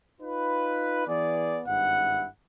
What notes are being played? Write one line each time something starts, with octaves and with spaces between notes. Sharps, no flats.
D#4 F4 B4
E3 B3 G#4 D5
G#1 G2 E4 F#5